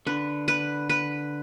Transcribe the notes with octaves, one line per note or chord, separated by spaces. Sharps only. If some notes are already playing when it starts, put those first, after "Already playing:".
D3 B4
B4
B4